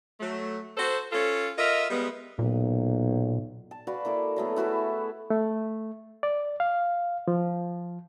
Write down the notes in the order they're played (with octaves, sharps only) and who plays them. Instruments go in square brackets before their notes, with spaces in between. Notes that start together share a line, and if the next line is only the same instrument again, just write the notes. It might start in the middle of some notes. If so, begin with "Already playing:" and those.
[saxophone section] F#3 A3
F#4 A4 C5
C#4 F4 A4
F4 A#4 D#5 E5
G3 G#3 B3
[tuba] B1 [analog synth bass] A#2
[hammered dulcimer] A5
F#4 B4 D5 F5
A#3 E4 A4 D6
F#3 A3 B3 G#4
E4 F#4 B4 A5
[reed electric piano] A3
D5
F5
F3